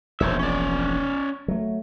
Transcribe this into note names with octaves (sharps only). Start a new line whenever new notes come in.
E1 A#1 C5 C#5 E5
C#4 D5
F#3 A3